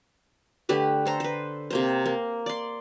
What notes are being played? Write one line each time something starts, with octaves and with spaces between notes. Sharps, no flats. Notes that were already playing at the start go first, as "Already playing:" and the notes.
D3 A3 G4 B4
A4 C5 A#5
B4 C5
C3 A#3 C5
A#3
D5 C6